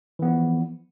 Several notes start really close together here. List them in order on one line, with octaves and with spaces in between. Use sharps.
E3 B3 F3